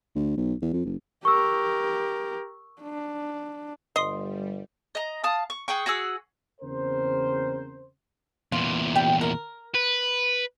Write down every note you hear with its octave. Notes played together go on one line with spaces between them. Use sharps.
D2
B1
E2
F2
F#1
G4 A#4 C#6 E6
D4
G1 G3 D#5 C6 D#6 C7
D#5 A#5
F5 A5 D#6
C#6
G#4 F#5 G5 C#6
F#4 G#4 F#5 E6
E2 C#3 C4 A#4 C5
E2 A#2 F4
G3 G4 G5
A#4
B4